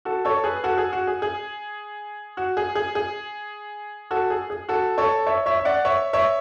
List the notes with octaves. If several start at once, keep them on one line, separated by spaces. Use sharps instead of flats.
F#4 A4
A4 C#5
G#4 B4
F#4 A4
G#4
F#4
G#4
G#4
F#4
G#4
G#4
G#4
F#4 A4
G#4
G#4
F#4 A4
A4 C#5
C#5 E5
C#5 E5
E5
D5 F#5
C#5 E5
C#5 E5